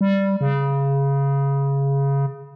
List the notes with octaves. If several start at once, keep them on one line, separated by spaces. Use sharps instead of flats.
G3
C#3